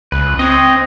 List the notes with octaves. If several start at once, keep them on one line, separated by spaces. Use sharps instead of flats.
C#2 B4
C4 C#5 D#5